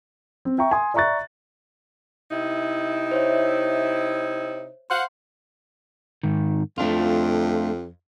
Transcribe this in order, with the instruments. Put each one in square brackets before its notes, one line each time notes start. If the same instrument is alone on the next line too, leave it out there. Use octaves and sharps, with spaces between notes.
[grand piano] C4
E5 G5 A#5 C#6
G#5 C6 D#6
D5 E5 A#5 C#6 F#6 A6
[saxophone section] C3 D#4 E4
[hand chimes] C5 C#5 E5
[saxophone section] C5 F5 F#5 [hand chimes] C6
[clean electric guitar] G#2 D#3
[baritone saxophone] F2 [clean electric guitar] A3 D4 F4